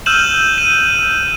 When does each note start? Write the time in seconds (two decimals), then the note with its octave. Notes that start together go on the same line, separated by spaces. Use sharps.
0.06 E6 F6 G6 D#7 E7 F#7
0.58 D#7